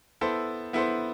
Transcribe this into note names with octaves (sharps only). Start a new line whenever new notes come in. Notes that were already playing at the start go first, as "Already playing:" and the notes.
B3 E4 A4 C5
B3 E4 A4 C5